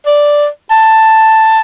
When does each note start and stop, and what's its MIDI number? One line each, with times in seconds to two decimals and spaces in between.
0.07 0.47 74
0.71 1.61 81